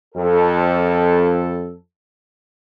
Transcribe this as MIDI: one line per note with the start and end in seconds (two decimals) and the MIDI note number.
0.15 1.74 41
0.15 1.74 69